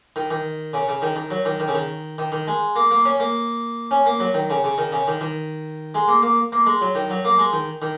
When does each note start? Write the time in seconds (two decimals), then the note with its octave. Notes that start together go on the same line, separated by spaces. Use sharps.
0.16 D#3
0.31 D#3
0.73 C#3
0.88 C#3
1.02 D#3
1.16 D#3
1.31 F#3
1.45 D#3
1.60 D#3
1.68 C#3
1.74 D#3
2.18 D#3
2.32 D#3
2.47 G#3
2.76 A#3
2.91 A#3
3.05 C#4
3.20 A#3
3.91 C#4
4.06 A#3
4.20 F#3
4.34 D#3
4.50 C#3
4.64 C#3
4.78 D#3
4.92 C#3
5.08 D#3
5.21 D#3
5.95 G#3
6.08 A#3
6.22 A#3
6.52 A#3
6.66 G#3
6.81 F#3
6.95 D#3
7.10 F#3
7.25 A#3
7.38 G#3
7.53 D#3
7.82 D#3